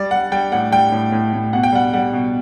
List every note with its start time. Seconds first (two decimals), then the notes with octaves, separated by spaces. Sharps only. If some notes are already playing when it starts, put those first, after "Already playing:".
Already playing: G3 D5
0.11 G3 F#5
0.32 G3 G5
0.52 A2 F#5
0.72 G3 G5
0.92 A2
1.12 A2
1.33 A2
1.53 B2 F#5
1.63 G5
1.73 G3 F#5
1.93 G3 F#5
2.13 B2